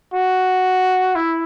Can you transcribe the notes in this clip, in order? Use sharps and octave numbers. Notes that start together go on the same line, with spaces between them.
F#4
E4